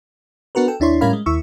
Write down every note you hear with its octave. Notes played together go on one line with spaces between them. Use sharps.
B3 D4 F#4 A#4 B4
A4 G5
D#2 D4 E4 C#5 C6
A2 G3 C#4 A#4 F5 B5
G#3
D#2 E4 C#6 E6